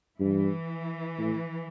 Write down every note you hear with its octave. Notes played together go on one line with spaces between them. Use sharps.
G2 E3
A2